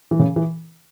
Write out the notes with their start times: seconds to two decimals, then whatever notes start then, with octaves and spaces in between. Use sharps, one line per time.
0.11 E3
0.19 C#3
0.36 E3